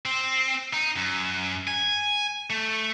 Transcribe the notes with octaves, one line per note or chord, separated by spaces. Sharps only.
C4
D#4
F#2
G#5
A3